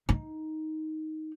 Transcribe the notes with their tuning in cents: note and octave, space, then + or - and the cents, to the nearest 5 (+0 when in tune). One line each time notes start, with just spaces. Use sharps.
D#4 +5